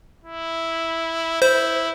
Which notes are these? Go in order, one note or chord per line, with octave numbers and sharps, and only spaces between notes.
E4
E4 C5